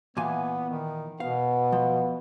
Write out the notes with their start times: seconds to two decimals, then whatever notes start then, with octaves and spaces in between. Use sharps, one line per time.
0.17 A#2 E3 B3 G#5
0.69 D#3
1.20 B2 B3 F5
1.72 F3